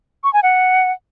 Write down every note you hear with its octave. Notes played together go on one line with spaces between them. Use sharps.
C#6
G#5
F#5